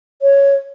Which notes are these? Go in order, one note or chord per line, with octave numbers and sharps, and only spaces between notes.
C#5